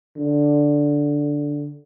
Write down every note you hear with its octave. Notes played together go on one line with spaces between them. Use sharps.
D3